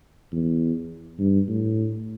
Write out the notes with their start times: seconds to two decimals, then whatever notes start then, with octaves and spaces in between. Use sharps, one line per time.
0.32 E2
1.19 G2
1.49 A2